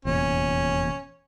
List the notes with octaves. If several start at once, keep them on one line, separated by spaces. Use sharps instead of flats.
F1 E2 A#2 C#4